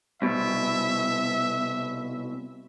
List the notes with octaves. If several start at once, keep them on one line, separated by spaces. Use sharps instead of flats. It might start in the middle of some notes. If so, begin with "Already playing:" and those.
C2 B2 E5